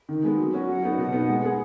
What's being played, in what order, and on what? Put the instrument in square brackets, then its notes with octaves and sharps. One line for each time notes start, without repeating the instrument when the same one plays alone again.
[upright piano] D#3
G#3 B3
F#3
C#4 F#4
[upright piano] F#3 [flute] F#5
[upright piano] B3 D#4 F#4
[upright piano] B2 [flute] F#5
[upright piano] B3 D#4
G#3
B3 G#4